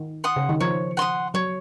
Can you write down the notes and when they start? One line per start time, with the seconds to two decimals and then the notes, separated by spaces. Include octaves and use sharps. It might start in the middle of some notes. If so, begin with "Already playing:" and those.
Already playing: D#3
0.24 F#5 C6 D#6
0.36 C#3
0.49 D#3
0.60 F3 C#5
0.97 F#5 C6 D#6
1.34 F#3 C#5